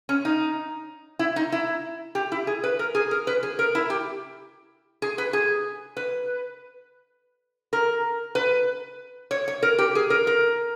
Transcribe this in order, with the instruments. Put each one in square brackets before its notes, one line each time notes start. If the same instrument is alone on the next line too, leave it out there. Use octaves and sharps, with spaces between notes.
[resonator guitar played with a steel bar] C#4
D#4
E4
D#4
E4
G4
E4
G#4
B4
A#4
G#4
A#4
B4
G#4
A#4
E4
G4
G#4
B4
G#4
B4
A#4
B4
C#5
C#5
A#4
G4
G#4
A#4
A#4